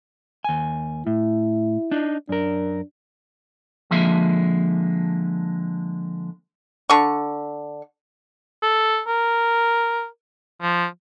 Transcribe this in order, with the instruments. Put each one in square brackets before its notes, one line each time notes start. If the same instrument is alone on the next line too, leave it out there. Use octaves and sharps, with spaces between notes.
[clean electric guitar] D#2 G#5
[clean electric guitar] A2 [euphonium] E4
[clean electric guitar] D4 D#4
[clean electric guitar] F#2 A#4 [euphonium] D4
[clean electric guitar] D3 F3 G#3 A#3 E5
[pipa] D3 C#6
[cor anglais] A4
A#4
F3